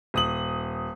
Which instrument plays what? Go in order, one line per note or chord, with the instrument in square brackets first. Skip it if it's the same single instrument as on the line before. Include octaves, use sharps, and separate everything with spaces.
[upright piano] D#1 D#6 F#7